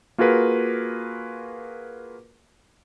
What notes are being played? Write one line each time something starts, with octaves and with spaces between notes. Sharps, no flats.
A#3 F4 F#4 G#4 A#4 B4